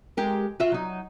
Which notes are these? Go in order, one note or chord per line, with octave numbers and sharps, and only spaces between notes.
G#3 G4 A#4
F4 F#4 E5
F#3 D#4